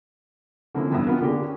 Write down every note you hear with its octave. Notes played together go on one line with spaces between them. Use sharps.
D3 F3 A#3 C4 C#4 E4
E2 G2 B3 E5 D#6
B3 C#4 F4 A#4
D3 A#3 D4 G4 G#4
C#4